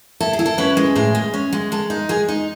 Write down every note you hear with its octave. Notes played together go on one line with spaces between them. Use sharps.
E4 A4
G#4
E4
A4
C#4 B4
G#3
A2 G#4
G#3
C#4
G#3
G#3 A4
D#4
G#3 G#4
D#4